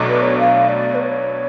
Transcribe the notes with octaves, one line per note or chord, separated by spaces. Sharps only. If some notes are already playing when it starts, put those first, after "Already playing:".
Already playing: B1 B2 F#3 A3 D4
B4
C#5
F5
D5
B4
C#5